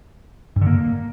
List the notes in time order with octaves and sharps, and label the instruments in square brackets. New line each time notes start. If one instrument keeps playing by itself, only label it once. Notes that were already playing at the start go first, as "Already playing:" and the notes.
[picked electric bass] G2
D3
A#3